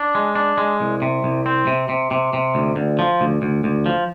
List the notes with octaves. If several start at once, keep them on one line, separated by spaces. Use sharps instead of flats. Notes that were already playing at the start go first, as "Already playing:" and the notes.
Already playing: D4
G#3
D4
G#3
C2
C3
C2
C4
C3
C3
C3
C3
D2
D2
F3
D2
D2
D2
F3